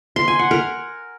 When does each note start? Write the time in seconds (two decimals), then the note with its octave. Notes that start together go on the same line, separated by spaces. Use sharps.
0.16 C6
0.28 G#5
0.39 F#5
0.51 A#4